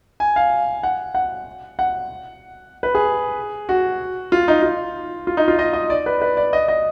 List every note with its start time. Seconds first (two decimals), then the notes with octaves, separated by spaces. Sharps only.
0.20 G#5
0.36 F5
0.83 F#5
1.15 F#5
1.79 F#5
2.83 B4
2.95 G#4
3.69 F#4
4.32 F4
4.48 D#4
4.63 F4
5.27 F4
5.37 D#4
5.48 F4
5.59 D#5
5.73 D#5
5.90 D5
6.06 B4
6.22 B4
6.37 D5
6.53 D#5
6.68 D#5